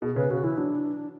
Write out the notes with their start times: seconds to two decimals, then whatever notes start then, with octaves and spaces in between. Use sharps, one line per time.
0.02 B2 G#4
0.16 C#3 B4
0.30 C#3 F#4
0.43 E3 E4
0.57 F#3 D4